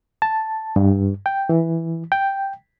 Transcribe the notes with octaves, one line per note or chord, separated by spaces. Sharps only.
A5
G2
G5
E3
G5